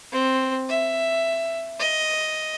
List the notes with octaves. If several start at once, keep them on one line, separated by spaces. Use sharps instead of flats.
C4
E5
D#5